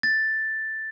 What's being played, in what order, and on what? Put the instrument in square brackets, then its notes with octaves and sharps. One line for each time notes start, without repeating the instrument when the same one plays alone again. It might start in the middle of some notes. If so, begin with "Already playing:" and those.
[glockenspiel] A6